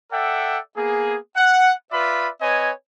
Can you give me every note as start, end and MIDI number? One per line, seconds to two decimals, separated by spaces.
0.12 0.59 69
0.12 0.59 74
0.12 0.59 76
0.12 0.59 78
0.12 0.59 79
0.77 1.18 58
0.77 1.18 59
0.77 1.18 68
1.37 1.72 78
1.92 2.29 65
1.92 2.29 71
1.92 2.29 74
1.92 2.29 76
1.92 2.29 83
2.41 2.71 60
2.41 2.71 71
2.41 2.71 73
2.41 2.71 75
2.41 2.71 80